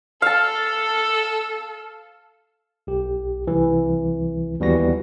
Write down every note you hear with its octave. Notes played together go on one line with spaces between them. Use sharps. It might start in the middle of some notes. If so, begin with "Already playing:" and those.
A4 F5 A5
B1 G4
C2 E3
D#2 E3 G3 B3 F#4 A#6